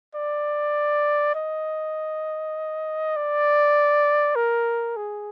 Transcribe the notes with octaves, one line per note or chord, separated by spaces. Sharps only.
D5
D#5
D5
A#4
G#4